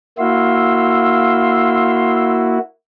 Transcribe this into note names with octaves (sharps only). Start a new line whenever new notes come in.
A#3 E4 F#4 F5 C6 E6